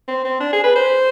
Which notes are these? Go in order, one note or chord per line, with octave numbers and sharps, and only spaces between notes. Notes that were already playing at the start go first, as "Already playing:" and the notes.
C4
C4
D4
G#4
B4
C5